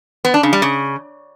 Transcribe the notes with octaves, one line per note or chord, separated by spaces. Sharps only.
B3
D4
C#3
G3
C#3